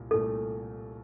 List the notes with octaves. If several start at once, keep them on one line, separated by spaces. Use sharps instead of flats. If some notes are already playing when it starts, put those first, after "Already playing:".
Already playing: C2 A#2
C2 A#2 A3 A4